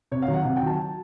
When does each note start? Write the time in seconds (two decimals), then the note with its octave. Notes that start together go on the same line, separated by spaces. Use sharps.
0.12 C3 C#5
0.22 F5
0.28 D#3 F#3
0.33 F#5
0.45 C3 F#5
0.56 G5
0.63 D#3 F#3 A5